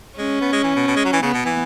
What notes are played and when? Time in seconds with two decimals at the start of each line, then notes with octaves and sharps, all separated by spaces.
0.17 G#3 C#4
0.41 B3
0.52 G#3
0.64 E3
0.76 B2
0.87 B2
0.96 G#3
1.05 F#3
1.13 E3
1.22 C#3 B3
1.34 B2
1.45 E3